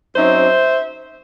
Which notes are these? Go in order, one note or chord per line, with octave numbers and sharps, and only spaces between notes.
F#2 F#3 C4 D#4 C5 E5